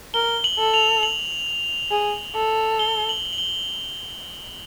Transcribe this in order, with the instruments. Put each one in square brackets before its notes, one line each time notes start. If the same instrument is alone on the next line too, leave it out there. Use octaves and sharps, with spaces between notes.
[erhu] A#4 [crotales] G7
[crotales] F#7
[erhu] A4
[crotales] F7
F#7
[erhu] G#4
A4
[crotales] G7
F#7
F#7
G7